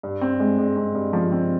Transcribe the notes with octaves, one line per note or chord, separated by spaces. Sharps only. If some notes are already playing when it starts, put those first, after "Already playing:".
G2
C4
G#3
G#3
C4
G2
F3
C4